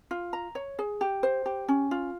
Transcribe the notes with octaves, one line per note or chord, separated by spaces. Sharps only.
F4
A#5
C#5
G#4
G4
C5
G4
C#4
F4